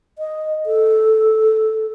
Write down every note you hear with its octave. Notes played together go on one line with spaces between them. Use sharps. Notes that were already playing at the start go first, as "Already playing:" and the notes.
D#5
A4